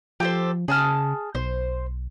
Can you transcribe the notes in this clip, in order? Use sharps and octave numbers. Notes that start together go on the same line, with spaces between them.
F3 G4 A4 C5
C#3 G#4 A5 F6
B1 C5